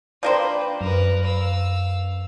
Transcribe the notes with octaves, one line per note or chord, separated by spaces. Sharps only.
F3 A#3 D4 B4 C5 D5 G5 B5
F#2 A#4 B4
F5 E6